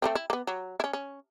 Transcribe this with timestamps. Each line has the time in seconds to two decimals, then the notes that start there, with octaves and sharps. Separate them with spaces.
0.02 A3 A#3 C4
0.15 E4
0.30 A#3 B3
0.47 F#3
0.80 C#4 E4
0.93 C#4